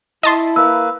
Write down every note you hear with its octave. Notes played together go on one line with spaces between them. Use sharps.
E4 D#5 A5 C6
A#3 B4 E6